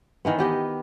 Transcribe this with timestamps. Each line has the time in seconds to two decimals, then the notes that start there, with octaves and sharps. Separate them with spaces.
0.25 D#3 E3 B3
0.39 B3 G4 D#5